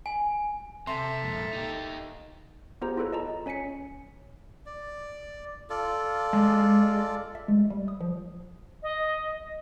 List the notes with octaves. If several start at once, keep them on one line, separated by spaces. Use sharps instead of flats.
G#5
C3 A4 E5 A5 A#5 C6
F2 A#2
D#4 G4
B3 F4 G4 G#4 C5 A#5
E4 F4 G#4 A4 B4 C#5
D#5 A5 A#5
C#4 C#5 G#5 B6 C#7
D5
F4 A4 D5
G#3
E5
G#3
G3
D#6
F3
D#5